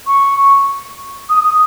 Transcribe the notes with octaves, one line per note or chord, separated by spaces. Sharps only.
C#6
D#6